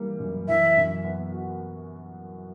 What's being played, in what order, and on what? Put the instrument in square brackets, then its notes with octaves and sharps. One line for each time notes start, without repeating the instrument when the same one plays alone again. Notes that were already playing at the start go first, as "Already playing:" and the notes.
Already playing: [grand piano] E3 G3 A#3
F#2
[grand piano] E3 [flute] E5
[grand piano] F#2
B3
F#4